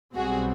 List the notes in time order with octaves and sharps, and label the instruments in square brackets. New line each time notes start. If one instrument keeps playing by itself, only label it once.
[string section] B1 B2 G3 C4 F#4 G#4